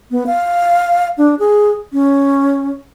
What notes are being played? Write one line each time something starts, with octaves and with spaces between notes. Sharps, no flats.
B3
F5
D4
G#4
C#4